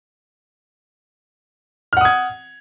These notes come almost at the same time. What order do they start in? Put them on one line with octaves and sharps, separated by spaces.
F6 F#5 D#6 G#6